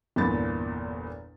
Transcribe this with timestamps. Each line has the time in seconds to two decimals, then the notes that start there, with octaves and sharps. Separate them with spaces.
0.16 G1 E2 A#2 B5 A6